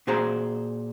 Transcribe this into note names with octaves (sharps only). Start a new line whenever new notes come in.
A#2 F#4 G#4 C5 A#5